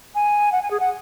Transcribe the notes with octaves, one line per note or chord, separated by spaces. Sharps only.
G#5
F#5
G#5
G#4
F#5